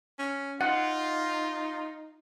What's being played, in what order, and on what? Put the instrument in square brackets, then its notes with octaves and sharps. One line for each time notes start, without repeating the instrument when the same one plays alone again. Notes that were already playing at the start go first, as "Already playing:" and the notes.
[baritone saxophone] C#4
[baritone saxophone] D#4 [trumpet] F4 [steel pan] F#5